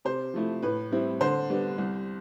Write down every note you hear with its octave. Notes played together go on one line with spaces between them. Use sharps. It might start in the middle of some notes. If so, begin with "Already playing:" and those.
C3 C5
F3 A3 E4
A2 B4
G3 C4 E4
D3 C5
G3 B3 D4
C2